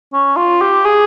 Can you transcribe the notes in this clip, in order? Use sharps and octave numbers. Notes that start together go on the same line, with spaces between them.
C#4
F4
G4
G#4